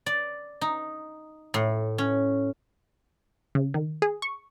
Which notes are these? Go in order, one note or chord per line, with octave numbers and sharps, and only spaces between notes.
D5
D#4
A2
C#4
C#3
D#3
G#4
C#6